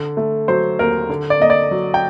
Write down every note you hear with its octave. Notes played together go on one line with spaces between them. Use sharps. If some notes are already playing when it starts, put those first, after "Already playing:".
Already playing: D3
A3
F#3 C5
D#2 A#4
D3
D5
A#3 D#5
D5
F#3
G5